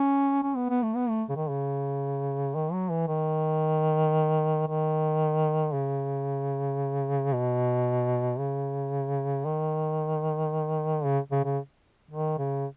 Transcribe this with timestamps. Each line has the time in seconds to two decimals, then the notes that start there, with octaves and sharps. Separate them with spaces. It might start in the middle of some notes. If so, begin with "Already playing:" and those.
Already playing: C#4
0.43 C#4
0.56 B3
0.70 B3
0.83 A3
0.96 B3
1.09 A3
1.29 C#3
1.36 D#3
1.49 C#3
2.55 D#3
2.73 F#3
2.91 E3
3.08 D#3
4.68 D#3
5.74 C#3
7.33 B2
8.39 C#3
9.46 D#3
11.05 C#3
11.31 C#3
11.45 C#3
12.11 D#3
12.38 C#3